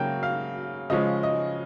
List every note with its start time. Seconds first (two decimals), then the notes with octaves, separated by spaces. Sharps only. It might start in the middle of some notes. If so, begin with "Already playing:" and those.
Already playing: C#3 F#3 A#3 G5
0.23 F5
0.90 C#3 F3 G#3 C#4 D#5
1.23 D#5